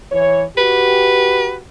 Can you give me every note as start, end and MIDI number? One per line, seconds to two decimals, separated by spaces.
0.12 0.44 52
0.12 0.44 73
0.57 1.62 66
0.57 1.62 67
0.57 1.54 71